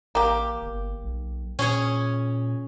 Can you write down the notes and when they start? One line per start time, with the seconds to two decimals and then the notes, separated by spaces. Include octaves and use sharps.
0.15 A1 A#3 G4
0.62 G1
1.04 B1
1.59 A#2 C#4 G#4 C#5